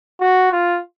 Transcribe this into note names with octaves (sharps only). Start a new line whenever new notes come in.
F#4
F4